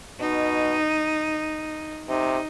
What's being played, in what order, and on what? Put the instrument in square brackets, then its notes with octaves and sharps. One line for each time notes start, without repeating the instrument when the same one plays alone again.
[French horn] B2 [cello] D#4
[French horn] C3 [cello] D#4